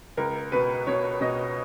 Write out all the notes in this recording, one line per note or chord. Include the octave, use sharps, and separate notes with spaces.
C#2 A#4
B2 B4
B2 C#5
B2 D#5